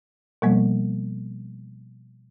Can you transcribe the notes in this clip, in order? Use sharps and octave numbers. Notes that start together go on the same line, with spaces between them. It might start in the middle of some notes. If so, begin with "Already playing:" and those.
B2 F3 G3 A#3 B3